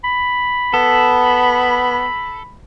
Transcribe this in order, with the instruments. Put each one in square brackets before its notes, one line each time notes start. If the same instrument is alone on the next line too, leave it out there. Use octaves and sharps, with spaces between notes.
[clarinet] B5
[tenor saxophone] B3 [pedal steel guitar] A4